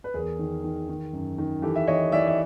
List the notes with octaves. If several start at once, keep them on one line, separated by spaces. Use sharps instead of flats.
B4
E2 G#4 A#4
D#3
D#3
D#3
F#2
D#3
E3 G4 A4
E5
E3 C#5 D#5
E3 D5 E5
E5